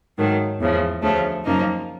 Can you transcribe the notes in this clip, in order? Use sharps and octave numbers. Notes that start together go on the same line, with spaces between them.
G#2 D#3 F#3 A3
E2 C#3 F3
D2 C#3 F3 A3
F#2 C#3 F3 A#3 D#4